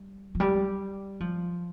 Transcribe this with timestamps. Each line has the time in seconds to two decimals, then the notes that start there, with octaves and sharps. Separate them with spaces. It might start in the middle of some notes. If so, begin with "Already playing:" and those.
Already playing: G3
0.35 F3
0.40 G3
1.20 F3